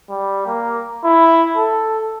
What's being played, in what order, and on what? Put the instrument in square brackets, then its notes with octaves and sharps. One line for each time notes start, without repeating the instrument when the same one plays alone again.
[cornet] G3
A#3
E4
A4